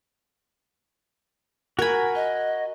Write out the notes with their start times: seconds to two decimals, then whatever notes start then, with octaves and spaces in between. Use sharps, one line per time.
1.79 F#4 A#4 G#5 B5
2.15 D#5